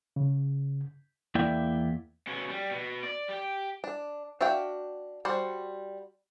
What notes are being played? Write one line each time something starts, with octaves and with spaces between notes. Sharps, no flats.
C#3
E2 A#3 E4 D5 E5 G5
B2 C#4
G3
B2
D5
G4
D4
D4 F#4 E5 F5 G5
G3 F#4 C5 F#5